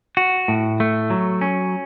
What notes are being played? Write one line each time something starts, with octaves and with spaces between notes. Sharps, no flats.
F#4
A2
A3
F#3
C#4